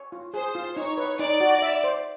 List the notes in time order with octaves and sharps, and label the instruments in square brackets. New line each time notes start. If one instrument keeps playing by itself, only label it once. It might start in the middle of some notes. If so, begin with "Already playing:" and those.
Already playing: [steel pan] C#5
F4
[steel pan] G#4 [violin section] C5
[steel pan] F4
[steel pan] D#4 [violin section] C#5
[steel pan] B4
[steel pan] D#4 [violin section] D5
[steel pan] F#4
E5
C5